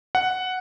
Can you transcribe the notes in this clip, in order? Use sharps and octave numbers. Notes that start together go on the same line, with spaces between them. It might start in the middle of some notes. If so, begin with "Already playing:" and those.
F#5